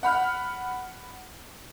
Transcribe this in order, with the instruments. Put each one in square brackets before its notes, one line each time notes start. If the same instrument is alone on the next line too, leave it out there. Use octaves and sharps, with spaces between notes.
[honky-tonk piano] F#5 B5 F6